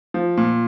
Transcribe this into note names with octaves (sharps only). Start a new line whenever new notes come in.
F3
A#2